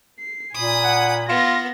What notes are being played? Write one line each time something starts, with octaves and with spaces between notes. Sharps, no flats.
C7
A#2 G#5 B5 D#6
F#5
B3 F4 A#6